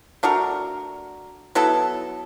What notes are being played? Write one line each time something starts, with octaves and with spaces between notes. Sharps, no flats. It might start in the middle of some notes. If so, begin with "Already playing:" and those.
A3 D4 F#4 A#4
F#3 B3 E4 A4